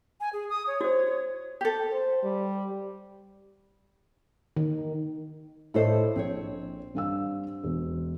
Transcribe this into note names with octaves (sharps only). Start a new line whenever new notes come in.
G#5
G#4
D#6
C#5
F#4 C5
G4 A4
C5
G3
D#3
A2 E4 A4 C5 C#5 D#5
A#1 C4 C#5
G2 F5 E6
E1